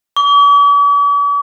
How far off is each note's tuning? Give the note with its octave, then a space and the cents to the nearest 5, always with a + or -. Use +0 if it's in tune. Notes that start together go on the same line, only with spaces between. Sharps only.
D6 -45